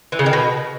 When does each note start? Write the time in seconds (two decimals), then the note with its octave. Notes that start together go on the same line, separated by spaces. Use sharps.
0.12 E3
0.19 C#3
0.26 D#3
0.33 B2